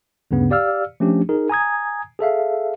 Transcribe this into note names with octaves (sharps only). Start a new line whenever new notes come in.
D2 G2 C#3 B3
G4 D5 F5 E6 F6
F3 A3 C#4 D4 G4
D#4 G#4 A#4
G#5 A#5 D#6 G#6
G#4 A4 E5 F5